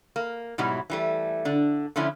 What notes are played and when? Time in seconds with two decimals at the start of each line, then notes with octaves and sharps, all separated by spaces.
0.16 A#3
0.58 G#2 B2 F#3 G3 E4
0.90 E3 G3 A3
1.45 D3 D4
1.96 D3 F3 A3 C#4 E4